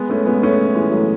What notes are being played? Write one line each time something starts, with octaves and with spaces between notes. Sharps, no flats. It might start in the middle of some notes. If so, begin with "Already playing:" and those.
Already playing: G#3 B3
A3 C#4
G#3 B3
A3 C#4
E3 G#3
F#3 A3